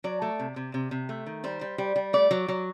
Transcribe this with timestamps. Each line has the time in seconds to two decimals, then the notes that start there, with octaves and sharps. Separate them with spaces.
0.04 F#3 D5
0.22 A3
0.39 C3
0.56 C3
0.74 C3
0.91 C3
1.09 A3
1.26 D#3
1.44 G3 C5
1.61 G3
1.78 G3
1.96 G3
2.13 A3 D5
2.31 F#3
2.48 F#3